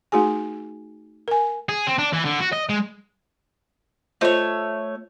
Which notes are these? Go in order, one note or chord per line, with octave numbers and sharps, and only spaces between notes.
A3 D#4 F#4 G#4 G#5
A#4 G#5
G#4
C4
D4
E3
D3
F#4
D#5
G#3
A3 F4 C5 C#5 D#5